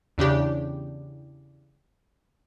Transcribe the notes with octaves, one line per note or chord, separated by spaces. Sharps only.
E2 C#3 D4 G4